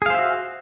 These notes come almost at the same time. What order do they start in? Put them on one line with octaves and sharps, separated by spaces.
G#4 F5 C5 E5 F#4